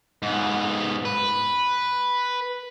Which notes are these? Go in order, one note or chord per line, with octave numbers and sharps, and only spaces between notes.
G#2 B3
B4